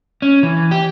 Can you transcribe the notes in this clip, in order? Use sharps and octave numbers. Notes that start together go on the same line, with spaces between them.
C#4
E3
G4